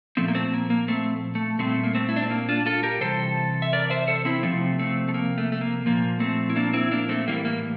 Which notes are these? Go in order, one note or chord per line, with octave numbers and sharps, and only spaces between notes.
A#2 F3 A3 C4
A#3
A3 C4
A#3
A#3
A3 C4
A3
A#2 G3 A3 C4
A#3
A3 C4
E4
D4
C4
A#3
D4 F4
F4 A4
G4 A#4
C3 E3 G3 A4 C5
E5
A#4 D5
C5 E5
A4 C5
C4 E4
C3 F3 A3 C4
A3 C4
A3
A#3
A3
A3
A#3
A#2 F3 A#3
A3 C4
E4
A#3 D4
C4 E4
A#3 D4
A3 C4
A2 E3 G3 A#3
A#3